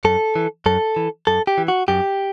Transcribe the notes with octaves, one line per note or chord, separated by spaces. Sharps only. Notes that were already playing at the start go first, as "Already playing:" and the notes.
F#2 A4
E3
F#2 A4
E3
F#2 A4
G4
E3
F#4
F#2 G4